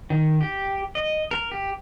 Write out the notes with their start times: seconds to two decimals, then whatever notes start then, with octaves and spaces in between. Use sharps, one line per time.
0.10 D#3
0.41 G4
0.95 D#5
1.31 A#4
1.52 G4